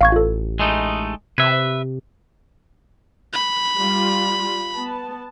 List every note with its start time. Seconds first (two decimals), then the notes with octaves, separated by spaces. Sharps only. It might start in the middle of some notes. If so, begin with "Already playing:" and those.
0.01 A1 F5 C#6 G#6
0.12 F4 A4
0.59 G#3 A3 D#4
1.38 C3 B4 E5 G#6
3.34 B5
3.77 G3 F4
4.76 B3 A5